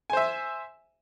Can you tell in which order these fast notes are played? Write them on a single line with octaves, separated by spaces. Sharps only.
G#5 C5 E5